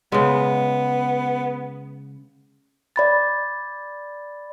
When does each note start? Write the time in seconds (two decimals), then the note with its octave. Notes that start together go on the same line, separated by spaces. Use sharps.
0.12 C#3 G#3 B3
2.96 D5 B5 A6